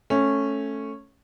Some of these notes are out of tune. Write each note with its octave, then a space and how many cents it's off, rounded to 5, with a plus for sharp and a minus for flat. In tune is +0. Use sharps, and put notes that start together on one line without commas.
A3 +0 C#4 -10